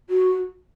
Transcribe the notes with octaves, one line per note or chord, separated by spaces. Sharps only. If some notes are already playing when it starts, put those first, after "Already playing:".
F#4